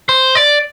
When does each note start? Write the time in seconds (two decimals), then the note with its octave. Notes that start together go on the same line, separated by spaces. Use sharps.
0.09 C5
0.35 D5